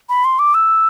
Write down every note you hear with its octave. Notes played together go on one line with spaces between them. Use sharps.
B5
C6
D6
E6